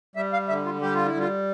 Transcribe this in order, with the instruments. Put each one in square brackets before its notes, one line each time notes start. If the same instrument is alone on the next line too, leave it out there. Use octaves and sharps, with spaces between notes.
[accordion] G3 E5
F5
D3 E5
F4
G3 G4
F4
E4
G3
F4